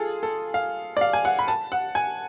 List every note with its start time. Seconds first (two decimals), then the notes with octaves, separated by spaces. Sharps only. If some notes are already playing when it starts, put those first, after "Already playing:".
Already playing: F4 G#4 A4
0.23 A4
0.54 F5
0.97 D5
1.01 F5
1.13 G#5
1.25 F#5
1.39 B5
1.48 A5
1.72 F#5
1.95 G#5